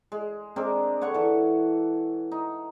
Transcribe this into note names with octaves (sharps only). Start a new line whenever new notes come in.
G#3
G#3 C4 D4 A#4
D3 C#5 F#5 C#6
E3 A4
D#4